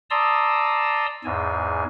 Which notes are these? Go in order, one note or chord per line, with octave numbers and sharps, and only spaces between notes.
D5 A5 A#5 C6 D#6 E6
E2 G#2 G#5